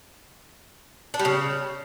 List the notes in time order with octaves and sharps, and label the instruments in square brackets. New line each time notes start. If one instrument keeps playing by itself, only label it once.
[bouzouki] D4
G3
C#3